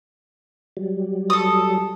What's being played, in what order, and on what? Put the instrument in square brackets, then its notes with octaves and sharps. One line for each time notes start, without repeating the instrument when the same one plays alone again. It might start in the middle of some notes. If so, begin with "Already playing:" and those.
[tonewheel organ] F#3 G3
[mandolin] A4 D#6